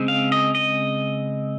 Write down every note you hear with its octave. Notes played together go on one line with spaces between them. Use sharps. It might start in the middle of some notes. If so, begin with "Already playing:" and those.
Already playing: C#3 G#3 C4
F5
D#5
D#5